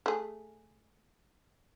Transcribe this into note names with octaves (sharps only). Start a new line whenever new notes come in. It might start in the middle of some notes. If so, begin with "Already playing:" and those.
A3 G#4